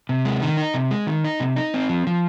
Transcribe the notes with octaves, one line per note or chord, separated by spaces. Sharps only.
C3
G#3
D#3
D#4
C3
G#3
D#3
D#4
C3
D#4
C4
F3
F3